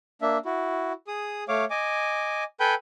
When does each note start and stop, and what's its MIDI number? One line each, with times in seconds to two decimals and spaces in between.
0.22 0.38 58
0.22 0.38 62
0.22 0.38 76
0.45 0.93 64
0.45 0.93 66
1.07 1.44 68
1.07 1.44 87
1.48 1.65 57
1.48 1.65 73
1.48 1.65 77
1.48 1.65 86
1.70 2.44 75
1.70 2.44 80
1.70 2.44 86
2.60 2.74 69
2.60 2.74 71
2.60 2.74 79
2.60 2.74 80
2.60 2.74 83
2.60 2.74 91